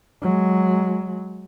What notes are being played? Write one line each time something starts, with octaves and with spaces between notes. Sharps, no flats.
F#3 G#3